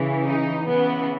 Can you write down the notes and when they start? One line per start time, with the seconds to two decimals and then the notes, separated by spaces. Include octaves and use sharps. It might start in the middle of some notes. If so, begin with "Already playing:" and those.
Already playing: C#3 E3
0.24 D#4
0.66 C#3 E3 B3